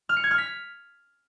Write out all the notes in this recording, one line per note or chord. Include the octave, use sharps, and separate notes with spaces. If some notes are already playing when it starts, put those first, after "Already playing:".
F6
C#7
G#6
F6
B6